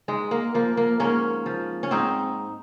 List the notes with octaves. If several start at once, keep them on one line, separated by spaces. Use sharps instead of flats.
G#2 G#3
A#3
F3 A#3
A#3
G#2 A#3 C#4
F3
C#4
G#2 C4 D#4